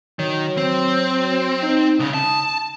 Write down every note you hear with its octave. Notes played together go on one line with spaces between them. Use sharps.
D#3 F#3
C4
D#4
C2 C#3 D#6
A5